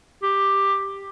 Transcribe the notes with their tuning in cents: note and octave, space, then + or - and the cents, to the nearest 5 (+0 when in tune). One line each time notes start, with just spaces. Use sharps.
G4 +10